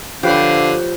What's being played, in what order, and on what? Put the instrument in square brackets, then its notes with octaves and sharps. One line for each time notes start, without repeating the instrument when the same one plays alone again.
[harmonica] D3 [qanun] F3 [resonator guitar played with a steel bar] G4 B4 C#5 [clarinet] F5